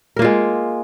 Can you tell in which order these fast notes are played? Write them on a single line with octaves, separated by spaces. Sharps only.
A#4 A#3 F4 G#3